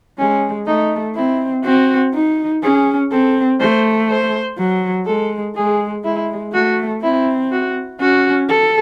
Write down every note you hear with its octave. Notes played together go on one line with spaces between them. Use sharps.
G#3 C#4
A3 D#4
C4 E4
C4 F#4
D#4
C#4 G#4
C4 A4
A3 C5
C5
F#3
G#3 A4
G#3 G#4
G#3 E4
A3 F#4
C4 E4
F#4
C#4 F#4
A4